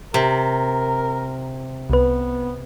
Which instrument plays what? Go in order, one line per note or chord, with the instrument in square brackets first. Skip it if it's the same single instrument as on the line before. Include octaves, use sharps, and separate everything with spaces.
[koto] C3 [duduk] A#4
[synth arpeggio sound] C2 B4 [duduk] B3